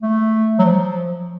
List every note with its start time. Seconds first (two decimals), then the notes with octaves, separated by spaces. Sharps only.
0.02 A3
0.59 F#3
0.65 F3